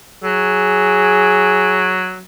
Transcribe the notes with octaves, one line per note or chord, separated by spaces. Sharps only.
F#3 G#4